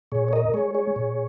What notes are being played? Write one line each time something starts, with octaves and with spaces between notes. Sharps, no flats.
A#2 G#4 C#5
C#5
A#4 D#5
G#3 G#4 C#5
G#4 C#5
A#2